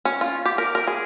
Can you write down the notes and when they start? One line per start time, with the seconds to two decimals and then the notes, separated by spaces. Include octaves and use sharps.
0.05 C#4
0.21 F4
0.46 G4
0.58 A#4
0.75 A#4
0.88 G#4